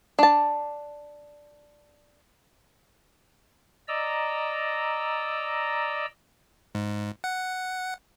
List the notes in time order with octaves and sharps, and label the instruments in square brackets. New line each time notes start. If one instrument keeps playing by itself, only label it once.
[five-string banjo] D4 A5
[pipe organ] D5 D#5 A#5 E6
[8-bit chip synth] G#2
F#5